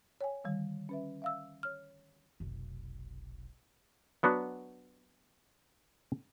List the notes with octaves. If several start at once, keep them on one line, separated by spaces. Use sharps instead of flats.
C#5 G5 G#5
D3 D#3 G3
C#4 B4 E5
E5 F5 E6
C#5 F6
F1 B1
F#3 B3 D4 F#4